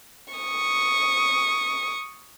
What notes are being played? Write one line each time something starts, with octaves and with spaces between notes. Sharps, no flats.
C#6 D#6